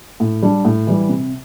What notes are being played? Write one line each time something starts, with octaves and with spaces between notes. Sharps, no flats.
A2
G3 D4
A2
E3 G3
C3